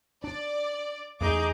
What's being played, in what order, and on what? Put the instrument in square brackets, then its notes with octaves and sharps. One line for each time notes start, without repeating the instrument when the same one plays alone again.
[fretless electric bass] D4 [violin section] D5
[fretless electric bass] E2 A3 [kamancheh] D#4 G#4 [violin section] D6 G6